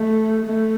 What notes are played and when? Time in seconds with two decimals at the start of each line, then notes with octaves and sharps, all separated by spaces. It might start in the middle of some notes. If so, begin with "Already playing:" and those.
Already playing: A3
0.46 A3